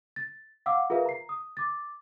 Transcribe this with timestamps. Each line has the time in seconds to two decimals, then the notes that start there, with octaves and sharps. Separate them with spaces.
0.16 A6
0.66 F5 F#5 D6 E6
0.90 F4 G#4 A#4 B4 E5 F5
1.06 A#5 C7
1.29 D#6
1.57 D6 A6